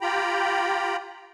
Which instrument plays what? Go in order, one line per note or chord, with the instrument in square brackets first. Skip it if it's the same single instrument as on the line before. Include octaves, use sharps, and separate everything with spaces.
[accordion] F4 G4 G5 A#5 B5